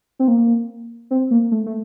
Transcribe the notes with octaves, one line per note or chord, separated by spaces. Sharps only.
C4
A#3
C4
A#3
A3
A3